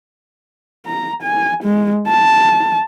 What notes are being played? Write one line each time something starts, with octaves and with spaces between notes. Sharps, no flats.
A#5
G#5
G#3
A5